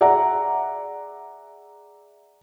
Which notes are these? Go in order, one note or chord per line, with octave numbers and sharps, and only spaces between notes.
G#4 D5 E5 F#5 A#5